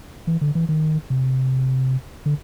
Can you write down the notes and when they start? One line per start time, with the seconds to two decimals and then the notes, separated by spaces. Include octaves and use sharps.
0.27 E3
0.41 D3
0.55 E3
0.69 D#3
1.10 C3
2.26 D3